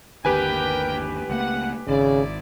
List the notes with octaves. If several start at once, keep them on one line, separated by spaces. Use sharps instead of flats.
G1 D#2 D3 G4 A#4 B4 G5 G#5
C#2 A3 A#3 F#5
G#1 C#3 E4 D5